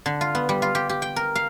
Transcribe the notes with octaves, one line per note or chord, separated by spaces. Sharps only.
D3
F4
B3
G3
F4
G4
G4
G5
A#4
F5